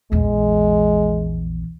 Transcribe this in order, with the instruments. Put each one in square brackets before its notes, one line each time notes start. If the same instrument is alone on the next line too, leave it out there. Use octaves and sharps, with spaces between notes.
[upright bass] A#1 E2 [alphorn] G#3